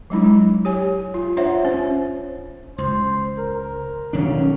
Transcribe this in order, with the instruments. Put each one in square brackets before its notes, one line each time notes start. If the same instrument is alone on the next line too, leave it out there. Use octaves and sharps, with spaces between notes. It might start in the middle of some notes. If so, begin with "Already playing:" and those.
[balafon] F#3 G#3 D4 E4
G4 C#5 G#5
F4
D4 F4 C5 C#5 E5 F#5
C#4 C5
[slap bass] C#2 [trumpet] C5
[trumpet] A#4
[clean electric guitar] B1 C#4 [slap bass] D#3 D4